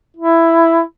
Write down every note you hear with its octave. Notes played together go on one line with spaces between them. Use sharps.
E4